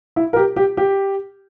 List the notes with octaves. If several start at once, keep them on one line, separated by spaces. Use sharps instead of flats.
E4
A#4
G4
G4
G4